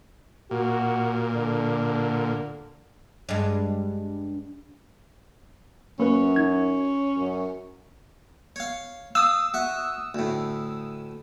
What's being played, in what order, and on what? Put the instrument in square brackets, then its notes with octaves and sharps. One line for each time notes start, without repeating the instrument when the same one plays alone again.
[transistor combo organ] A#2 [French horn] F#4
[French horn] D3
[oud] G2 G#3
[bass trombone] F#2 [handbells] A#3 B4 [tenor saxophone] C#4
[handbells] D#4 G#6
[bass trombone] F#2
[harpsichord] C#5 F5
[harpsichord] F5 [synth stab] D#6 E6
[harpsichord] F#4 E5
D2 A2